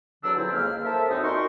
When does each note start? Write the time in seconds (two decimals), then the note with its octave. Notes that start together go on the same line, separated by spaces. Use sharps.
0.23 E2 B2 D3 F#3 D4 E6
0.36 F2 C#3 F3 F#3 C4 E4
0.53 C#2 A#3 F6
0.85 A4 A#4 C5 E5
1.09 F#2 C3 C4 D#4 F#4 D#6
1.22 A#2 D#4 F#4 A#4 C6 C#6